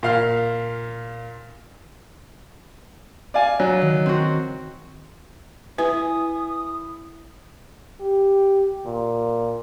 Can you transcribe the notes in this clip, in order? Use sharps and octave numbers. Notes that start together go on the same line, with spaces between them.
A#2 F5 F6
D5 F5 G#5
F#3
D#3
C4 F#4
E4 B4 G#5 D#6
G4
A#2